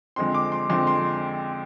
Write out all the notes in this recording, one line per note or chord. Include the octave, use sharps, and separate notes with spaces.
F2 D3 G#3 C4 C6
D6
C6
F2 D3 G#3 C4 C6
C6